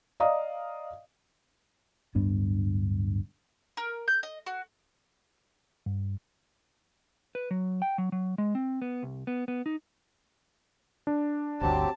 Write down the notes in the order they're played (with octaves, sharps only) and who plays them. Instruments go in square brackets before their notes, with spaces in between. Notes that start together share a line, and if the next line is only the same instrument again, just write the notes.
[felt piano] D5 D#5 F5 A#5 D#6
[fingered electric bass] D1 G2 B3 D4
[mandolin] A#4
G6
D#5
F#4
[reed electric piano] G2
[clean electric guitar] B4
F#3
G5
F#3
F#3
G#3
C4
B3
C2
B3
B3
D#4
[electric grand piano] D4
[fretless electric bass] G1 D2 [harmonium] F#3 C4 G4 [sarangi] A5